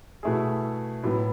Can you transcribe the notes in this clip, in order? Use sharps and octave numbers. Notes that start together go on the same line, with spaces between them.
B2 A3 E4 G#4
A2 F#3 B3